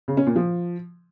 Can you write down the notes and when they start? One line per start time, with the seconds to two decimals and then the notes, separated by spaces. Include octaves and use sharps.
0.08 C#3
0.17 C#4
0.27 A#2
0.36 F3